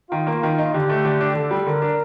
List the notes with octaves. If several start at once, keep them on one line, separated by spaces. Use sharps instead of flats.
D#3 F4
A#3
D#3
D#4
D3 G4
A3
D3
D4
D3 A4
G3
D3 A#4
D4